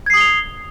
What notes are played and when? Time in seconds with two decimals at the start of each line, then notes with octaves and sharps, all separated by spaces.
0.06 G#6
0.10 C7
0.13 D#6
0.17 G7
0.20 F7